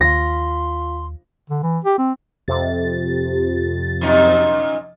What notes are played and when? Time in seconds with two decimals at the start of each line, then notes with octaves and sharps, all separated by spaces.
0.01 D#2 F4 F5 C6 A#6
1.50 D3
1.63 E3
1.84 G4
1.98 C4
2.48 F2 C3 A6
4.01 F#2 A#2 D#4